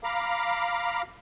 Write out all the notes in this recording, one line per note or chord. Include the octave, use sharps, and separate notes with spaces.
F5 A#5 B5 D6